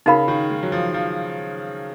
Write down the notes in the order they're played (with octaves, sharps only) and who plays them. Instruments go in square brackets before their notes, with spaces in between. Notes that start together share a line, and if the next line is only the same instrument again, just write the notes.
[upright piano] C#3 [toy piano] D#4 F#4 A#4 F5 B5
[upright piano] D#3
G#3
F#3
F3
F3